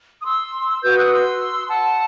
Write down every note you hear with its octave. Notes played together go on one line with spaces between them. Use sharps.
D#6
C6 E6
F#4 B4 E6 G6
D#6 F#6
C6 E6
F#5 A5